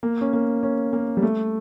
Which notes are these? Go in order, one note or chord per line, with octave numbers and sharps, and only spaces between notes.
A#3
C#4
A#3
C#4
A#3
G3
A3